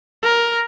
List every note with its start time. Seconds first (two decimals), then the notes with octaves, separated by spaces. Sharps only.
0.23 A#4